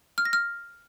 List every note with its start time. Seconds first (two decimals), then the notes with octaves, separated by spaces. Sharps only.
0.18 F6
0.25 A#6
0.33 F6